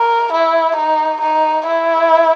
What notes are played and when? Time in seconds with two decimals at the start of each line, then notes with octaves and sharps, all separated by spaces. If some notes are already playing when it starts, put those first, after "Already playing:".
Already playing: A#4
0.33 E4
0.76 D#4
1.21 D#4
1.66 E4